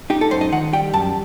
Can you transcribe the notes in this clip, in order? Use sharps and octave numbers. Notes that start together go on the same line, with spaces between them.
D#4 G4
A4
F#2 C5
D#5
D#3 F#5
G3 G5
F#2 A5